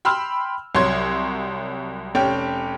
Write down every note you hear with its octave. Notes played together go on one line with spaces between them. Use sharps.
G5 B5 C6 E6 F6
C2 F#3 C#5 C6 G#6
F1 C#4 G4 G5